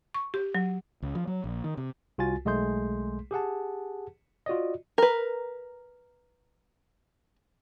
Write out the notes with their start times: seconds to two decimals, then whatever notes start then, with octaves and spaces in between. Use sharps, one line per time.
0.14 C#6
0.34 G4
0.55 F#3
1.02 C#2
1.15 F3
1.27 F#3
1.44 A#1
1.64 D#3
1.77 C3
2.18 C2 F4 F#4 G#5 A6
2.45 B1 G#3 A3 G#4 C6 G6
3.31 G4 G#4 F#5 A5
4.46 F4 F#4 D5 D#5
4.98 A#4 B4